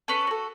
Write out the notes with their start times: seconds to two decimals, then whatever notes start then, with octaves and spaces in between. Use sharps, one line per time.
0.08 C#4 A4 B4
0.27 F#4 A4